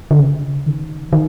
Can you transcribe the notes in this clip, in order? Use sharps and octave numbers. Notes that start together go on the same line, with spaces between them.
D3
C#3
D#3
D#3